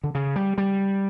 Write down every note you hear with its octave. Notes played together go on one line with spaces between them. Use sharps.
D3
C#3
G3
G3